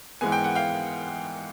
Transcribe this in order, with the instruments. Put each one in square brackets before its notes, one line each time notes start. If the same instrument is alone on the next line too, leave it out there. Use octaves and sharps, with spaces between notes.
[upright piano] G#2 E3 G#3 B3 G#5
G5
F#5
F5 G5